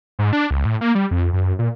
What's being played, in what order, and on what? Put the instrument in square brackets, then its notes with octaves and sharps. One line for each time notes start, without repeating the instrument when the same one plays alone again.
[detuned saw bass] G#2
D4
C#2
A2
A#3
G3
F2
F#2
A#2